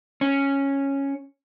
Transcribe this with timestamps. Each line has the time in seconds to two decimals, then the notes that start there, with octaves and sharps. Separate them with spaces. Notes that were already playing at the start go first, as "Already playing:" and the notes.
0.21 C#4